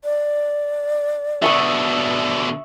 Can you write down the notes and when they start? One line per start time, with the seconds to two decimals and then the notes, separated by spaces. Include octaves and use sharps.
0.04 D5
1.42 B2 D3 E5 C#6 D#6